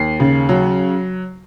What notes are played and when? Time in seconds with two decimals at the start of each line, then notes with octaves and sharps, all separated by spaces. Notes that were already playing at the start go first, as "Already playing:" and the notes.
Already playing: D#2 C7
0.20 C#3
0.49 F#3